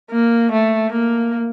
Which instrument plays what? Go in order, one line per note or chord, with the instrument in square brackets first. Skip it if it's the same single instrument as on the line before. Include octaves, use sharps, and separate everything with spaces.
[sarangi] A#3
A3
A#3